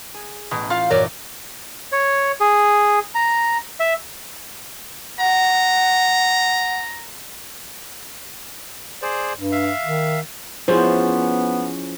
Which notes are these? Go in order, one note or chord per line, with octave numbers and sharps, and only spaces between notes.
G#4
A1 B2
F4 F5 G6 C#7
G2 A#2 E3 F#3 A#4 C#5 D5
C#5
G#4
A#5
E5
F#5 A#5
G#4 C5 D5
G2
E5 F5
D#3
F3 B3 C#4 E4 G#4 C5